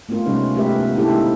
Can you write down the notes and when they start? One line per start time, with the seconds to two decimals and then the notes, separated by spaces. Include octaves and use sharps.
0.09 A3 B3 C4 F4 A#4
0.26 C3 G3 G#3 C#4 D#4 B4
0.55 G#3 A3 G4 A#4 B4 E5
0.79 B3 F4 A4
0.95 A#3 D4 E4 G4 A4
1.08 G#3 C4 D#4 E4 G#4